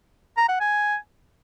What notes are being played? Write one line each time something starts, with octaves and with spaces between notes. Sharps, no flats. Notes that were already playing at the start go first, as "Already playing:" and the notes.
A#5
F#5
G#5